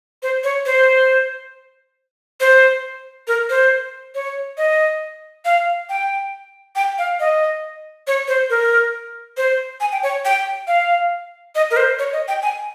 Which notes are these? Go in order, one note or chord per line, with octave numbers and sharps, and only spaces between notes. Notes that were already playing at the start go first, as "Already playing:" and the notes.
C5
C#5
C5
C5
A#4
C5
C#5
D#5
F5
G5
G5
F5
D#5
C#5
C5
A#4
C5
G#5
G5
C#5
G5
F5
D#5
A#4
C5
C#5
D#5
G5
G#5